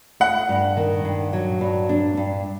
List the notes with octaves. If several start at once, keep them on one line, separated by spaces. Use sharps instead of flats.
A3 F#5
G2
D#3
G2
F#3
G2
D4
G2